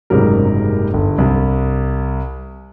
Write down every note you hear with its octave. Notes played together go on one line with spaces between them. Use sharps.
F#1 G#2 C3 F#3 G3 A#4
G1
C2